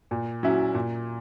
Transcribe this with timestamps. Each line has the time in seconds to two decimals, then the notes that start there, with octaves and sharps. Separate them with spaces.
0.11 A#2
0.43 F#3 C#4 E4
0.74 A#2